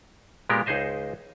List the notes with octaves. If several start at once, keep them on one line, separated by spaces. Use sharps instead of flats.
A#2 G#3 B3 G4 A#4
C#2 D#4 G#4 C5 D#5 E5